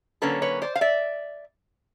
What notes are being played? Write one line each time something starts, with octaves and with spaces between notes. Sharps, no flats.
D3 F#3 A#3 C#4 A4 B4
B4 C#5
C5 D5
F5
D5 E5